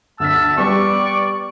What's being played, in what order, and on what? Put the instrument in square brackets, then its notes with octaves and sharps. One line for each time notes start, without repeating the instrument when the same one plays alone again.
[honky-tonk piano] D2 F6 B6 [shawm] A5 [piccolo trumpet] E6
[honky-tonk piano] G3 B3 [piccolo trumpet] D5 [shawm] C#6